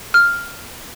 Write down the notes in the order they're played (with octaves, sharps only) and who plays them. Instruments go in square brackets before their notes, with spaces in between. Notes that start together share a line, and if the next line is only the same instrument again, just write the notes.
[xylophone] F6